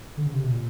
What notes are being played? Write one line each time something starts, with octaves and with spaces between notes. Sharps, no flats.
D3
C#3
C3
B2
A#2